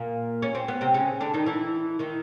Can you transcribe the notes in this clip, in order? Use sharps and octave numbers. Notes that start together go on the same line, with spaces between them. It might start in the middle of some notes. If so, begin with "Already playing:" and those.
Already playing: A#2 A#3
C#4
C4
B3
C3 C4
C#3 C#4
D3 D4
D#3 D#4
E3 E4
D#3 D#4